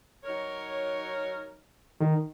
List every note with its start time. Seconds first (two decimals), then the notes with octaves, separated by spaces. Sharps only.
0.23 F#3 D#4 A#4 C#5
2.00 D#3